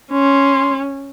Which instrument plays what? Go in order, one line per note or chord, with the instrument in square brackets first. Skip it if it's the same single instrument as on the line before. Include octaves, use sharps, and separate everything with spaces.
[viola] C#4 [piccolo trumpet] C6